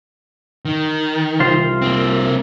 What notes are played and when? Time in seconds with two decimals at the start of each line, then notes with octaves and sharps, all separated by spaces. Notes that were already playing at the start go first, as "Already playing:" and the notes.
0.65 D#3
1.40 C2 F4 C5
1.82 A#3 C4